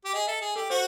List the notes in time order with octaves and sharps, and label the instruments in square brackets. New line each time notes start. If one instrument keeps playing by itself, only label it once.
[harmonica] G4
[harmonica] G#4 [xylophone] D#5
[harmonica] A4 [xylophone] E5
[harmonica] G#4
[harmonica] G4 [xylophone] A4
[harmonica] F#4 [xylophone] C5